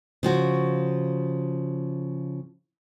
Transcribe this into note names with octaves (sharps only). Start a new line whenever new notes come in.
C#3 F3 F#4